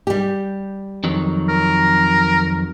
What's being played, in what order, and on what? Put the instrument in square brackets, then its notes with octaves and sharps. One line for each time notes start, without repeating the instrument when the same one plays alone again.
[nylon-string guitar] G3 G4
[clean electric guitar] F2 D#3 F#3
[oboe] A#4